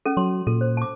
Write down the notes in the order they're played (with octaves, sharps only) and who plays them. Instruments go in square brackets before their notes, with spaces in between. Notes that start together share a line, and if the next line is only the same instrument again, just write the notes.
[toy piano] C#4 A4
[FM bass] F#3 [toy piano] C6
[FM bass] A#2 [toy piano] A4
[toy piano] C5
A5 D6